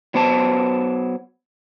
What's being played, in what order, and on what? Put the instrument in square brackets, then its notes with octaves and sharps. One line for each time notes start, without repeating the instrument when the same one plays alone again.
[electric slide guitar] F#3 B3 C5 A5